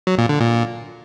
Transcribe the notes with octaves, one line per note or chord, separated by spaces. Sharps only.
F#3
A#2
D3
A#2